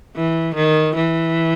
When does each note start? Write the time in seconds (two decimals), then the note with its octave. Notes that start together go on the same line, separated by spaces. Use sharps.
0.16 E3
0.55 D#3
0.96 E3